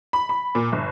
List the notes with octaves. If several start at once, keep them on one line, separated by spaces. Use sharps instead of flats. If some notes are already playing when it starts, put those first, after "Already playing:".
B5
B5
A#2
G1